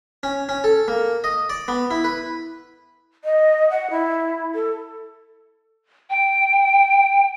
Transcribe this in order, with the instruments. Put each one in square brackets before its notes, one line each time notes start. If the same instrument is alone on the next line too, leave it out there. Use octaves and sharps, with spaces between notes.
[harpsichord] C#4
C#4
A4
A#3
D#5
D5
B3
E4
B4
[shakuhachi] D#5
F#5
E4
A4
[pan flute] G5